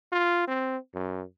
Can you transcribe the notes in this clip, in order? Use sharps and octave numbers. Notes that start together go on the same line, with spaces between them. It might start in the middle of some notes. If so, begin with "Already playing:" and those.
F4
C4
F#2